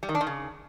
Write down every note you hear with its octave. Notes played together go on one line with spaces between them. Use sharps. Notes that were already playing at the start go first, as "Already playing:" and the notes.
G3
D#3
D4
D#3
C#3